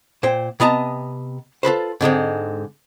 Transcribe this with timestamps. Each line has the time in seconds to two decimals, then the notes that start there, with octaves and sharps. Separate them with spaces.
0.23 A#2 C5 G5
0.60 C3 B3 D#5 A5 A#5
1.63 F4 A4 B4 C5
2.01 G#2 D3 G#3 C4